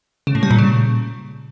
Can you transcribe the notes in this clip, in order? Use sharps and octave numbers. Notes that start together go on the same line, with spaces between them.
C#3
A2
G3
A#2
C#3